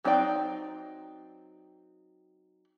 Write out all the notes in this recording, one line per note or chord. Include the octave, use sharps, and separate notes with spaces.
F#3 C4 D#4 D5 G5